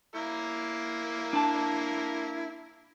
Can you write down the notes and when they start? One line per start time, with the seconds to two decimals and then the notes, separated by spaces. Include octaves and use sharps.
0.15 A#3 E4 A#4
1.33 D4 A5